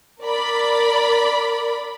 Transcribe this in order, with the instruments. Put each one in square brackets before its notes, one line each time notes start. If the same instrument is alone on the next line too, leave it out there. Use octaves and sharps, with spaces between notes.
[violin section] A#4 D5 B5